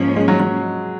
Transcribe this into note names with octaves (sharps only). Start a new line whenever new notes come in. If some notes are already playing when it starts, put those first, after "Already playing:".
Already playing: G#2 F3 A#3 C#4
G#3
F#3
F#3